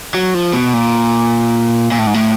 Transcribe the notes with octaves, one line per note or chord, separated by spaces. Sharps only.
F#3
F3
B2
A#2
A#2
A2
G#2
A2